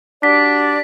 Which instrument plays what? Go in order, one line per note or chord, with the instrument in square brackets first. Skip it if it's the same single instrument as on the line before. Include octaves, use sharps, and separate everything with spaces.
[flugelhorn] D4 [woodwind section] F#4 G4 D5 [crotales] B6